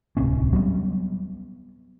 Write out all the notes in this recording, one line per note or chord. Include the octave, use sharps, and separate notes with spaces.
D1 C2 C4 C#4
F#3 G3 B3